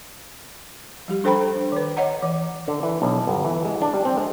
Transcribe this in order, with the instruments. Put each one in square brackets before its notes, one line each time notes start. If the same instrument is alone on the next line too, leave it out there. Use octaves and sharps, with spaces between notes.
[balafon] F3 G3 G4
D4 A4 C5 G5 A#5 B5
D#3 B4
C#5 D#5 F#5 A#5
E3
[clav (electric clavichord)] D3
E3
B1
G1
E3
G#3
D4
G3
C4
G#3